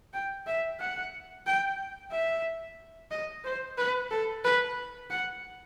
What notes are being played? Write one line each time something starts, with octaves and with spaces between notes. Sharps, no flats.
G5
E5
F#5
G5
E5
D#5
C5
B4
A4
B4
F#5